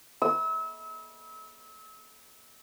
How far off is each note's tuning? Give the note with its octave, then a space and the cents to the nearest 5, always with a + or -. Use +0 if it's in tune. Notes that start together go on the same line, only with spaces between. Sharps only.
E6 -35